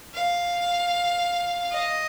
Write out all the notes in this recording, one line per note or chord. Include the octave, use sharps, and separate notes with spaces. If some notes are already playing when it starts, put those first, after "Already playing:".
F5
D#5